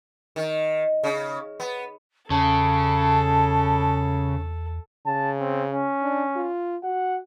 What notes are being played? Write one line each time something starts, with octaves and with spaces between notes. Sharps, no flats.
D#3
C#3
B3
E2 C#3 A4 A5
C#3 A5
C4
C#4
D4
F4
F#4 F#5